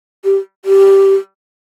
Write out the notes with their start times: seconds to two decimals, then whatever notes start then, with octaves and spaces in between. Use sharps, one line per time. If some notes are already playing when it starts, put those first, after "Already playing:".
0.24 G4
0.65 G4